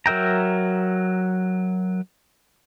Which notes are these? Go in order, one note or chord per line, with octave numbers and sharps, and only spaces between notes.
F#3 A#4 E5 G5 A#5